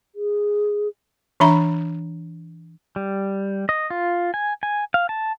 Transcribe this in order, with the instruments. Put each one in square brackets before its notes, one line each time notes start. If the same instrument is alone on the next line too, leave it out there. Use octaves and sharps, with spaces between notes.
[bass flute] G#4
[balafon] E3 D4 E5 A#5 B5
[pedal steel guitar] G3
D#5
F4
G#5
G#5
F5
A5